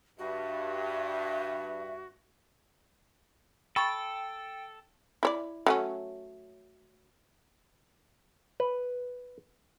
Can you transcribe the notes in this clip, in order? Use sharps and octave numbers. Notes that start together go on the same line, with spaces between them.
G2 F#4 E5
A4 G5 B5 C#6 A6
E4 C#5 D5
F#3 A3 C#4
B4